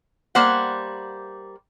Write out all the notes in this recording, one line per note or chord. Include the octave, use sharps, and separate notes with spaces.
G3 A#3 C5 F#5